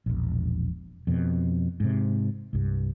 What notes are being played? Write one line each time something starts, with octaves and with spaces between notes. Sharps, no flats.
E1 A#1
F2 B2
G#2 C3
C2 G2